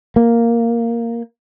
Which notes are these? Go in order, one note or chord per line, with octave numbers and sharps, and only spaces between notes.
A#3